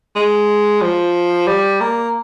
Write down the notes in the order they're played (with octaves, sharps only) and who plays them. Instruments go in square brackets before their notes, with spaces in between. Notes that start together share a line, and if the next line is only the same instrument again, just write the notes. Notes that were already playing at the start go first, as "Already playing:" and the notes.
[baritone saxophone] G#3
F3
G3
A#3